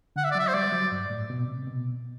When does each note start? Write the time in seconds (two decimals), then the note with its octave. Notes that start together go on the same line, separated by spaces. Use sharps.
0.16 D3 F#5
0.24 E5
0.31 D5
0.35 F#3 E5
0.47 C5
0.54 G3 D5
0.72 F#3
0.92 G2
1.10 A2
1.30 B2
1.48 C3
1.67 B2